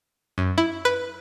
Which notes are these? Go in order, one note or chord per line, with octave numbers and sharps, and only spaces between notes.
F#2
E4
B4